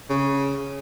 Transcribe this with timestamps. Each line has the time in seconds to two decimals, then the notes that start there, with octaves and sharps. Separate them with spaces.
0.10 C#3